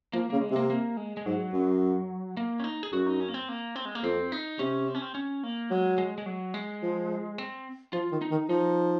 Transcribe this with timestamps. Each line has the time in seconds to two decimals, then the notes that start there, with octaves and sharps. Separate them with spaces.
0.13 F3 A#3
0.30 C#3 A#3
0.41 G#3
0.51 C3
0.56 A#3
0.70 A#3
0.97 G#3
1.17 G#3
1.26 G#2 F#3
1.53 F#2
2.37 A#3
2.60 C#4
2.64 D#4
2.83 G#4
2.93 F#2 F#4
3.06 D#4
3.20 C#4
3.29 A#3
3.34 C4
3.49 A#3
3.76 C4
3.85 G#3
3.95 A#3
4.03 F2 C4
4.32 D#4
4.59 C3 C#4
4.88 C4
4.95 C#4
5.02 C4
5.15 C#4
5.43 A#3
5.71 F#3 G#3
5.98 G#3
6.18 G#3
6.26 F#3
6.54 G#3
6.82 F3
7.38 C4
7.93 F3 F4
8.11 D#3
8.22 D#4
8.31 D#3
8.49 F3 D#4